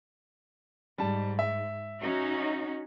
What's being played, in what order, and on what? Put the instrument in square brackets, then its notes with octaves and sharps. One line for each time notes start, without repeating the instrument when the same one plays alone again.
[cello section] G#2 [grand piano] G3 A5
[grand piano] E5
[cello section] C#4 D#4 F#4